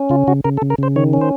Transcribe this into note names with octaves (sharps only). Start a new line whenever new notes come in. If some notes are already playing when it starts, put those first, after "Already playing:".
Already playing: C#4
C#3 F4
C#3 F#4
C#3 A#4
A4
C#3
A#4
C#3 C5
D#3 C#5
C#4
C5